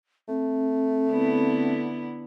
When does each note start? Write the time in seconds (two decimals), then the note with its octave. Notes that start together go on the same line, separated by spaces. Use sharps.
0.28 A3 C4
1.09 D3 B3 E4